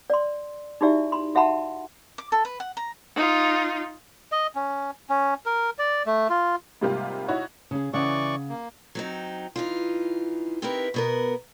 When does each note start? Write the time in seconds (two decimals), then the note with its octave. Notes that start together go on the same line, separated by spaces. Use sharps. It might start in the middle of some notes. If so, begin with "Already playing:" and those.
0.10 D5 C6
0.81 D#4 E4 F#4 G4 D5 E5
1.12 B5 C6
1.35 F#4 E5 F#5 A5 B5 C6
2.18 D6
2.32 A4
2.45 B4
2.60 F#5
2.77 A#5
3.16 D#4 F4
4.32 D#5
4.55 C#4
5.09 C#4
5.46 A#4
5.79 D5
6.06 A3
6.30 F4
6.81 G#2 C3 G3 A#3 F4 G4
7.28 D#4 E4 F#4 C#5
7.71 C#3 G#4
7.93 C#3 E3 D5 F#5 C#6
8.49 A#3
8.95 F#3 C4 D#4
9.56 E3 D#4 F4
10.62 C4 D#4 E4 G4 A#4 B4
10.94 B2 B3 A#4